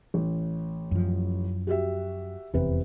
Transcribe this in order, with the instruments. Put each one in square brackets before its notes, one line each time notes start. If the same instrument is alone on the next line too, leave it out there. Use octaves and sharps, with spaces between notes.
[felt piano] A1
[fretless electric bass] F#2 F3
[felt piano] F#4 G4 E5
[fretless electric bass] F1 E2 [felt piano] C3 B4